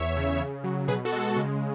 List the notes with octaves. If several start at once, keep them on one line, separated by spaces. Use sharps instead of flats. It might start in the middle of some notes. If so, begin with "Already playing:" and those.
Already playing: E2 C#5 E5
C#3
C#3
F#3
B2 G#4 B4
F#4 A4
G#3
F#4 A4
C#3